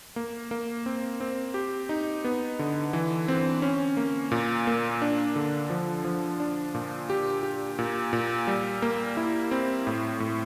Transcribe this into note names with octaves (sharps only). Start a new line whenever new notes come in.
A#3
A#3
C4
C4
G4
D#4
B3
D3
E3
C4
C#4
A#3
A#2
A#3
D4
D3
F3
F3
D4
A#2
G4
G4
A#2
A#2
G3
A#3
E4
C4
A2
A2